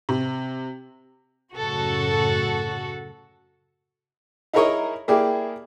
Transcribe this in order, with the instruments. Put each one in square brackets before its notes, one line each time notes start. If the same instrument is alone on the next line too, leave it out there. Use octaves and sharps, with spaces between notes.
[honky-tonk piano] C3
[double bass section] F#2 A2 C#3 [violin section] F#4 A4 F#5
[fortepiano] D#4 E4 G#4 A#4 C#5 D#5
A#3 E4 G4 G#4 D5